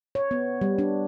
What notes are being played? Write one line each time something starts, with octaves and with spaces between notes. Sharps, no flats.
C#5
B3
G3
D4